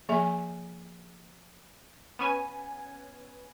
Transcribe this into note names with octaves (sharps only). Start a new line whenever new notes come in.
F3 A#3 G#4 E5 G#5
B3 C#4 G#5